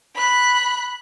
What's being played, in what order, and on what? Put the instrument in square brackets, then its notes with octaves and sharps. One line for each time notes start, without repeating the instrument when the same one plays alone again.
[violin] B5 F#6